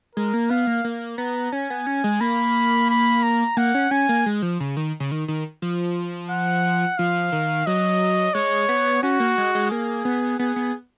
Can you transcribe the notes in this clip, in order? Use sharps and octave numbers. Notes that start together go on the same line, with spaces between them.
G#3 A#4
A#3
B3 F5
A#3
A#3
B3 A#5
C#4 G#5
B3
C#4
G#3
A#3 B5
B5
A#5
A#3 F#5
C#4
C#4 G#5
A#3
G#3
F3
C#3
D#3
C#3
D#3
D#3
F3
F#5
F3 F5
D#3
F#3 D#5
G#3 C#5
B3
C#4 F#4
A#3
G#3
G#3
A#3 G#4
B3
B3 G#4
B3